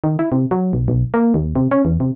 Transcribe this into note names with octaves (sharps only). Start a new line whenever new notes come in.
D#3
E4
C3
F#3
B1
B1
A#3
D#2
C3
C#4
E2
C3